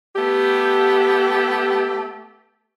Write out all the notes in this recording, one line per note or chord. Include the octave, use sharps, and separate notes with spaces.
A3 B3 G4